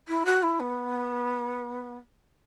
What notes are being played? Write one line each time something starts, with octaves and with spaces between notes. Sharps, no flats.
E4
F#4
E4
B3